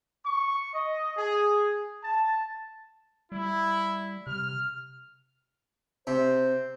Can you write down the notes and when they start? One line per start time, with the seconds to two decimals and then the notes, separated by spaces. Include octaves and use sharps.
0.24 C#6
0.73 D#5
1.16 G#4
2.03 A5
3.32 G3 E4
4.27 C3 F6
6.07 C3 C5